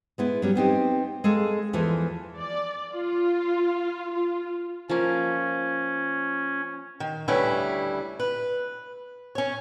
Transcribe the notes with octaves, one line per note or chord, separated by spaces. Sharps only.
G#3 B3 E4
F#3 G3 C#4
B3 C4 D#4 G4
G#3 G#4 A4 F5
E2 E3 F3 A4
D5
F4
F4
F3 A#3 C#4
D#3
D2 G3 A3 C#4 E4 B4
B4
C#4 C#5